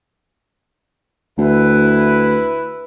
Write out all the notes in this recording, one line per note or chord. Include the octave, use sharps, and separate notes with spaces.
D2 E4 B4